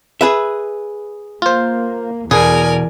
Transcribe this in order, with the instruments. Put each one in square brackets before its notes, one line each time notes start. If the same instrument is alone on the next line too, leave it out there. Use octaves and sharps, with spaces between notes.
[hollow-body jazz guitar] G#4 B4 E5
[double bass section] A#3 [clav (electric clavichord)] F4 C5
[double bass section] E2 [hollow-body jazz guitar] B2 [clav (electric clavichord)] G#4 [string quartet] A#4 D5 G#5